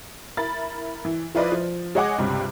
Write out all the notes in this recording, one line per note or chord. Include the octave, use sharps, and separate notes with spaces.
E4 A#4 B5 A6
E3
F3 E4 F4 B4 D5 D#5
F3
G#3 C#5 D#5 F#5 G#5 D6
C#2 G2 C3 G3